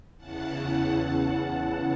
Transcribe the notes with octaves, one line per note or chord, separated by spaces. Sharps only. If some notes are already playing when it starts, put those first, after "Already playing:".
E2 C#3 E3 F#5 A5